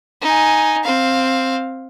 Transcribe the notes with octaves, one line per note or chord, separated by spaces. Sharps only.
D#4 G#5
C4 F5